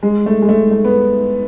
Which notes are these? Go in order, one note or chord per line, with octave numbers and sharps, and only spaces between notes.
G#3
A3
G#3
A3
A3
B3